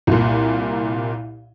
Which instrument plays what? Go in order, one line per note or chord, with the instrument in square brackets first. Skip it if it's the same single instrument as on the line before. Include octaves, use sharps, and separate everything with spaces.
[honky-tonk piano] C2 A#2